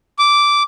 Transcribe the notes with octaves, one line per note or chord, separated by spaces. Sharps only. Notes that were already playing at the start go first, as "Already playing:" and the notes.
D6